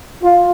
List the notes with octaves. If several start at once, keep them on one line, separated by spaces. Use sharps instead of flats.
F4